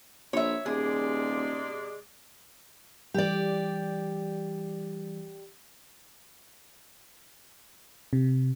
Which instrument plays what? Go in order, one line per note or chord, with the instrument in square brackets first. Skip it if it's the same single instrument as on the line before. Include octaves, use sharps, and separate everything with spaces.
[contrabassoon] A#1 [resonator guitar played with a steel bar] C#5 E5
[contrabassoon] D#1 [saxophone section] C3 G#3 D5 [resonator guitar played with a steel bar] G#4
[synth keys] E3 G3 [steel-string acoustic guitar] G4 D5
[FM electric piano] C3